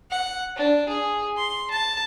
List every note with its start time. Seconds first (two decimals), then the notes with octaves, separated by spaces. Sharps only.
0.11 F#5
0.56 D4
0.89 G#4
1.37 C6
1.70 A5